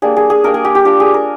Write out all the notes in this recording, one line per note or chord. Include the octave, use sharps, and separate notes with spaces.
G3 A#3 D4 G#4
G#4
G#4
G3 A#3 D4 A#4
G#4
G4
G4
G3 D4 F4 G4
G#4
A#4